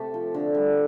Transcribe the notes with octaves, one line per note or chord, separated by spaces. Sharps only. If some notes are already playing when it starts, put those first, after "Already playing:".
Already playing: C3 A3 G4 A4
F3
D3
G3